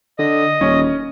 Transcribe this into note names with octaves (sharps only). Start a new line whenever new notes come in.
D3 D#5 D#6
D#1 C#4